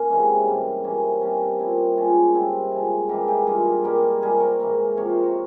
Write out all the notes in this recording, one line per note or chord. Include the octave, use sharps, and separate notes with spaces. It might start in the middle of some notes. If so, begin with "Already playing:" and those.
Already playing: A#3 C#4
C3 E3 G#3
G#2 G3 A#3
C3 E3 A#3 C#4
C3 G3 A#3 C#4
A#2 G3 A#3 C4 E4
A#2 G#3 C#4 F4
C3 G3 A#3 C4 E4
C3 F3 G#3
C#3 E3 G#3 G4 A#4
E4 G4
G2 G3 A#3 F4 G#4
G#2 G3 A#3 G4 A#4
C3 G3 A#3 G#4 C5
A#4 C#5
G#2 E3 A#3
C3 F3 A#3 C#5
C5
A#4 C#5